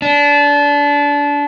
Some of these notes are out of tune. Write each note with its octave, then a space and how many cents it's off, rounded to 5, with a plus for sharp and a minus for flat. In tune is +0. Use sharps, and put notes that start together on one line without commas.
D4 -25